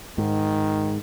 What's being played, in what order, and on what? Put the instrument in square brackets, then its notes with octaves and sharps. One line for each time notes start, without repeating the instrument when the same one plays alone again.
[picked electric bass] G#2 [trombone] D#3